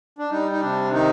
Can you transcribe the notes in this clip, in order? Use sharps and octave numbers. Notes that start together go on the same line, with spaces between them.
D4
G3 D#4
D#4
C3 D4
D#3 D#4